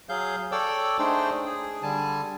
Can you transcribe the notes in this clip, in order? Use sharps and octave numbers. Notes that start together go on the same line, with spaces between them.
F#3 G#4 F5 G6
A4 C#5 D5 G5 D6 E6
A3 D4 D#4 G#4 C5 G5
G#4
D3 G3 G#5 A5